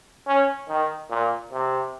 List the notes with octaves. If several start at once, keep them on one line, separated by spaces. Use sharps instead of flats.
C#4
D#3
A#2
C3